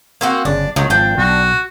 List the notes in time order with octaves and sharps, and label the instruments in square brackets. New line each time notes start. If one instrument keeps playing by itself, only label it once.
[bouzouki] A#3 C4 F#4
[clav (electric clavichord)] G1 C#3 [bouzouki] D4
[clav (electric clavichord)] C#2 [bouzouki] D#3 F#3
[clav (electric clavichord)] G#1 F3 C5 [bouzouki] D4 G5
[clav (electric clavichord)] B1 [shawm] F#4